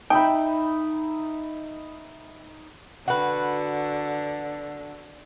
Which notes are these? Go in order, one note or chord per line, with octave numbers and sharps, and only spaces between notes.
D#4 E5 G5 B5
D3 F#4 B4